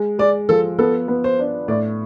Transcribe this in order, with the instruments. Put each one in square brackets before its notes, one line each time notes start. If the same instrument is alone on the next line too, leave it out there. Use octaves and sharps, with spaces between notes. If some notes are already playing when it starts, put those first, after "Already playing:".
Already playing: [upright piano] G#3
[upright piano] G#3 [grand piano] D5
[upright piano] F3 [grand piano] A4
[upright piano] B3 [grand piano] A4
[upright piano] B3
[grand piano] C5
[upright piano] D4
[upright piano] A2 [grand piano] D5